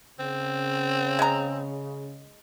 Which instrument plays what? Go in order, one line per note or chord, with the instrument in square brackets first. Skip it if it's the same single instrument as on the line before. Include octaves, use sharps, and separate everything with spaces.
[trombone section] C#3 [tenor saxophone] C4
[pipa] G#3 A#5